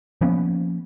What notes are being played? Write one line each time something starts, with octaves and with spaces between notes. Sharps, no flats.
F3 A#3 B3 C#4